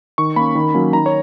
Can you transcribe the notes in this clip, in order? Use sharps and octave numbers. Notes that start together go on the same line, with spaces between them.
D#3 C#6
A#3 C#4 B5
D#3
F#3 A#3 C#4
D#3 A#5
C#5